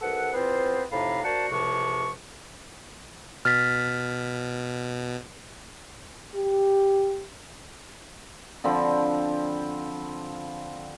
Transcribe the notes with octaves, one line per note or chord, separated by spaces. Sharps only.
C2 A4 B4 F#5
E2 B3 C4 F4 C5
F2 A2 C3 D#4 F5 B5
A#3 D4 F#4 C5 F#5 A5
C#2 A2 C3 F3 F#5 C#6
B2 F6 A6 B6
G4
D3 F3 C4 B5